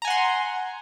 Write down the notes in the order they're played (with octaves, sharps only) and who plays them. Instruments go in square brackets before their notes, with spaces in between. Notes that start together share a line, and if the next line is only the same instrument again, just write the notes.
[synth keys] A#5
G#5
F#5
C6